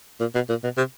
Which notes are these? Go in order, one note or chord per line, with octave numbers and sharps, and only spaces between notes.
A#2
B2
A#2
B2
C3